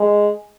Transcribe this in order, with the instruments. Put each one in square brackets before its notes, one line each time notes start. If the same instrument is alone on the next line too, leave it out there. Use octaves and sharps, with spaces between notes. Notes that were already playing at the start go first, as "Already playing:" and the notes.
Already playing: [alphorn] G#3